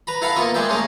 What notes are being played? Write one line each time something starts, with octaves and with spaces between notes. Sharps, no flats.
B4 A#5 B5
E4 A4 F5 F#5 A#5 B5
A#3 B3 F4 D#5 C#6
G#3 G#4 D5 E5 G5
A3 A#3 C#4 G#4 A#4